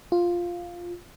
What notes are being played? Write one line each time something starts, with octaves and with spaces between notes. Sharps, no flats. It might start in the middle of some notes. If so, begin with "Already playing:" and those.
F4